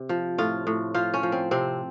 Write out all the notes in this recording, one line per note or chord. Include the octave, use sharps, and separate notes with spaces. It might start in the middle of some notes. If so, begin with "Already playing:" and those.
Already playing: C3
F3
A2 F4
A2
F3 F4
C#4
F3
C4
C3 C4